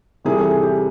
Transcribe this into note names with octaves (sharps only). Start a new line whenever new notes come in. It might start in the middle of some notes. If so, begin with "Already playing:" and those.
C2 C3 E3 G3 G#4
A4
G#4
G4